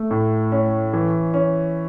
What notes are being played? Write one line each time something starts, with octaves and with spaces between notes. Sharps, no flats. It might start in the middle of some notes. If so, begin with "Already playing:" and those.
Already playing: A3
A2
C#4
E3
C#4